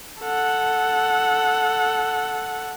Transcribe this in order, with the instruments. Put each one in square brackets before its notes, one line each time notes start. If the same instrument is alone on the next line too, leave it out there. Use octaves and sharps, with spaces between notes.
[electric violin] A4 F#5